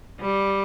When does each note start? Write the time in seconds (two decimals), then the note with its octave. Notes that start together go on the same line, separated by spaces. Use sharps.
0.20 G3